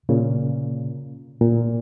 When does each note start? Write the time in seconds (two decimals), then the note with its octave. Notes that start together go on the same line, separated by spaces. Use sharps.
0.09 A#2 C#3
1.41 A#2